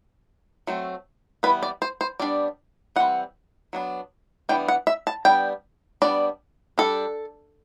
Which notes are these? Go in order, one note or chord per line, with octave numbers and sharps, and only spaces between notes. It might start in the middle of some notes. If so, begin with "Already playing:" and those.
F#3 A3 C4
E3 G3 B3 B4
D5
C5
C5
G3 B3 D4 D5
E3 G3 C4 F#5
F#3 B3 D4
E3 G3 B3 D4 G5
F#5
E5
A5
G3 B3 D4 G5
G3 B3 D4 D5
G3 D4 A4